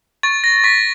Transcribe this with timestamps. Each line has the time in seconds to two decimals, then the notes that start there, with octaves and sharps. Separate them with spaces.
0.23 C#6 A6
0.44 A#6
0.64 C#6 B6